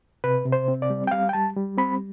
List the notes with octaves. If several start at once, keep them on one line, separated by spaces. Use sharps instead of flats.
C3 B4
C3
C5
C4
D5
G3
G5
G3 F5
G5
G3 A5
G3
C4 B5